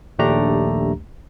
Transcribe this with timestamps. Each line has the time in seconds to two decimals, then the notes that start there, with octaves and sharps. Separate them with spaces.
0.19 A#1 D#2 A3 D4 G4 A#5